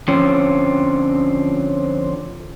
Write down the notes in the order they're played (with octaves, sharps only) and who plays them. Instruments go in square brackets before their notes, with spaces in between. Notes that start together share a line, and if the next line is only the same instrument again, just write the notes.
[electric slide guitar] D3 F3 C4 C#4